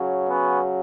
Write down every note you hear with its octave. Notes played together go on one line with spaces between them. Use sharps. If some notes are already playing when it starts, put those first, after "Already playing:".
Already playing: C#3 F#3
B3 C#4